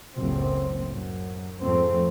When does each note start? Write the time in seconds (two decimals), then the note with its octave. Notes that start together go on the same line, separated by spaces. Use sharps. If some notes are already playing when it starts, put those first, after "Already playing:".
0.15 F#1 C#2 A2 C4
0.92 F#2
1.61 F2 G#2 F3 A3 C4